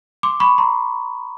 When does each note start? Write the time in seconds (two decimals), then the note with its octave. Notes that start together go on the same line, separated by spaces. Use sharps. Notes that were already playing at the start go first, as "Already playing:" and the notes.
0.23 C6 D6
0.40 B5 C#6
0.58 A#5 C6